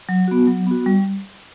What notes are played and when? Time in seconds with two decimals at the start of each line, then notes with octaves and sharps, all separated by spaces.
0.09 F#3
0.28 B3 F#4
0.47 F#3
0.67 B3 F#4
0.86 G3